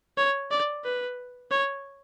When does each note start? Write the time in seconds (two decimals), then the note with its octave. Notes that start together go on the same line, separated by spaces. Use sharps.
0.17 C#5
0.51 D5
0.84 B4
1.51 C#5